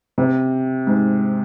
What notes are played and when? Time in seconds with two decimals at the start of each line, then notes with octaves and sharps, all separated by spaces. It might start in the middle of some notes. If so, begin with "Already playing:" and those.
0.18 C3
0.87 G#2